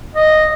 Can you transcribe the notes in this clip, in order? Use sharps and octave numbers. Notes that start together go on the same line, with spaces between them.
D#5